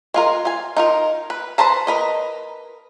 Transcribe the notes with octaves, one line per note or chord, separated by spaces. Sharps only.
G#3 F4 A#4
F4 G#5
D#4 F4 A#4
B4
B4 C5 A5 A#5
A#4 B4 D#5